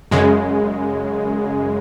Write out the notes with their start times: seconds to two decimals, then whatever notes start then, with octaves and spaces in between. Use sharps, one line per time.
0.11 F#2 C#3 G#3